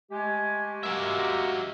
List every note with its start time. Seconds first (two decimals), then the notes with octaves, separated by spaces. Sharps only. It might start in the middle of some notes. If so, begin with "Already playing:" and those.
0.12 G#3 A3 G4 G#5
0.83 F#3 A#3 E5